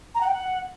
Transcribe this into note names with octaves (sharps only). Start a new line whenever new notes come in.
A#5
F#5
G5
F#5